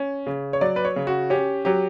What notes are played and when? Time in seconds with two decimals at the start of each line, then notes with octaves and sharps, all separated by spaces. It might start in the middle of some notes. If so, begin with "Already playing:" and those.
Already playing: C#4
0.27 C#3
0.53 C#5
0.61 F#3 D5
0.76 B4
0.85 C#5
0.96 C#3
1.07 F#4
1.30 C#4 G4
1.65 F#3 G4